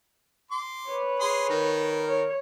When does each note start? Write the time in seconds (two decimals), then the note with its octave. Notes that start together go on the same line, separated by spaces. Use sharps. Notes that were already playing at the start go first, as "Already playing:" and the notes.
0.51 C6 D6
0.88 B4 C#5
1.20 G#4 C6
1.49 D#3 A#4
2.08 C#5